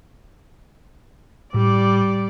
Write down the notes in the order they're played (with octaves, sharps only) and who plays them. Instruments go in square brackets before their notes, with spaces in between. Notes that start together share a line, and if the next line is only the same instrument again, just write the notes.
[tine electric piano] A2 [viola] G3 D5